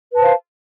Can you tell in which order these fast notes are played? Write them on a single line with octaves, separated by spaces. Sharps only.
B4 A5 C5 F5